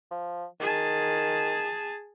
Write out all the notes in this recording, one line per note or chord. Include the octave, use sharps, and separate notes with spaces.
F3
D#3 G#4 A5